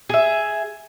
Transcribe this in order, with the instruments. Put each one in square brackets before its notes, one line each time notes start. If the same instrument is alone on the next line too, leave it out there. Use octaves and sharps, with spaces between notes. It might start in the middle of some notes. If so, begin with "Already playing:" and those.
[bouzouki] G#4 E5